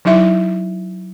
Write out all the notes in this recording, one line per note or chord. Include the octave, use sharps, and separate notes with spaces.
F#3 D#4 E4 E5